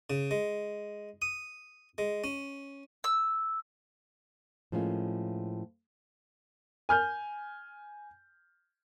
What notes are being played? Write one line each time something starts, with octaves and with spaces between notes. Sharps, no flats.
C#3
G#3
D#6
G#3
C#4
E6
A2 F3 G#3 A#3 C#4 F4
G#5 F6 G6